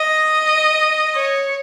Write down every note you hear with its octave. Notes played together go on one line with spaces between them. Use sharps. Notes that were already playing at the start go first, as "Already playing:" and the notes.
Already playing: D#5
C#5